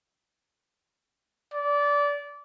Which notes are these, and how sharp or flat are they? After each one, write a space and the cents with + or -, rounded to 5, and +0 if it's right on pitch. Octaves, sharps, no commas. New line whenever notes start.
D5 -20